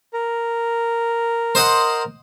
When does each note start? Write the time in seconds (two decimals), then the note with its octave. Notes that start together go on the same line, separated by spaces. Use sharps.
0.13 A#4
1.55 C5 D#5 F#5